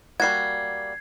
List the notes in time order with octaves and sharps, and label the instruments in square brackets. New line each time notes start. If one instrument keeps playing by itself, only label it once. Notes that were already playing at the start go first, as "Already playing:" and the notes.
[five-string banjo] G3 A#3 F#4 [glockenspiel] G#6 C7